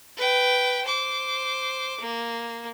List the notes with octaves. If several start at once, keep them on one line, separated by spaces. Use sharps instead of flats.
B4 G5
C5 D6
A#3